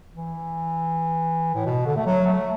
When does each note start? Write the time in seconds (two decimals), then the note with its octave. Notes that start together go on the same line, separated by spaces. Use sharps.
0.15 E3
1.55 A2
1.65 B2
1.86 D3
1.96 A3
2.06 F#3
2.26 A3